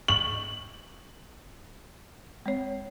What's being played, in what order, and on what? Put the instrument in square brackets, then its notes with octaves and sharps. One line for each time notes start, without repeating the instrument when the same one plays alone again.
[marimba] C#6 [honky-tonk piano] F#7
[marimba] G#3 C4 C#5